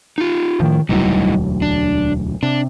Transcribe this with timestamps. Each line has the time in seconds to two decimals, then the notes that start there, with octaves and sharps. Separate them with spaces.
0.18 D#4 F4
0.60 A2 D#3 F3
0.89 E1 D2 F#3 G3 D#4 E4
1.62 D4
2.43 C3 D4